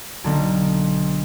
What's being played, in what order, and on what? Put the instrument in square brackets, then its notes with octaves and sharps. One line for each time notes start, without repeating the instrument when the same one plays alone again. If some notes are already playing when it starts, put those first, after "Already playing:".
[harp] B1 D3 A#3